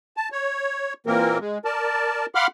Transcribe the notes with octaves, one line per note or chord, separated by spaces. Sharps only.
A5
C#5
A#2 E3 A#3 C4 A#4
G#3
A#4 D5 A5
F5 F#5 B5 C6 D6 F6